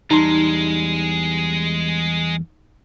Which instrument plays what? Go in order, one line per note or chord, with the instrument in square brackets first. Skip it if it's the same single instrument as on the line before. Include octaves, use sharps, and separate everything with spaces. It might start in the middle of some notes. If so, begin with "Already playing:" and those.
[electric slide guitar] E2 G3 A#5 [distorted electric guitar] G#3 [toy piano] D#4 C6